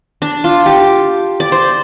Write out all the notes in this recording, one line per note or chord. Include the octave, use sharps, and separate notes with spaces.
D4
F4
G4
D5
C5